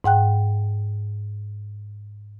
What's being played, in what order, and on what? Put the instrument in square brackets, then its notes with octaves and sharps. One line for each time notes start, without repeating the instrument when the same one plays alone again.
[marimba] G#2 F#5 G5 F#6